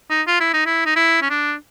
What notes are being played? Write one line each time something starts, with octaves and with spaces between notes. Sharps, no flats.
D#4
F4
E4
D#4
E4
D#4
E4
C#4
D4